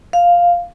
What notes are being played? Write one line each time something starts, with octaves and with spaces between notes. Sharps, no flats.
F5